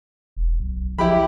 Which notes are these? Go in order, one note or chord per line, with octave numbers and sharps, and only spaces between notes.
E1
B1
F3 E4 G4 B5